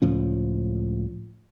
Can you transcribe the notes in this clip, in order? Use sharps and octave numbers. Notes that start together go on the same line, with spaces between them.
C#2 A2 F3 C#4